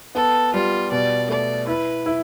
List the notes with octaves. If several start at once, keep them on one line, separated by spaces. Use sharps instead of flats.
B3 A4
G3 F4
B2 D5
A3 D5
E4 B4
E4